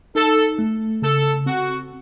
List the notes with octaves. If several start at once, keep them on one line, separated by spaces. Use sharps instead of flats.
D#4 A4
A3
C#3 A4
C4 F#4